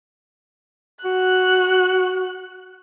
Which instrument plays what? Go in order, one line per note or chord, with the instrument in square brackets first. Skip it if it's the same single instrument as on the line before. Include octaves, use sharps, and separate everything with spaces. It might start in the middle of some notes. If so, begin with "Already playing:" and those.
[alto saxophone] F#4 [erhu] F#6